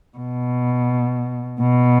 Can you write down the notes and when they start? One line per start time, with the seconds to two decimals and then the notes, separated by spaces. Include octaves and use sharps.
0.18 B2
1.61 B2